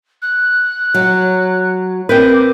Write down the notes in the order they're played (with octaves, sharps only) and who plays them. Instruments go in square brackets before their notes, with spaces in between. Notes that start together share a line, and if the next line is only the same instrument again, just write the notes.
[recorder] F#6
[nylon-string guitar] F#3
[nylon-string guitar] C4 A#4 B4 [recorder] G6
[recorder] D6